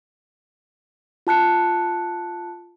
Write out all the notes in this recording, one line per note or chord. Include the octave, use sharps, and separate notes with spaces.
F4 A5 F#6 C#7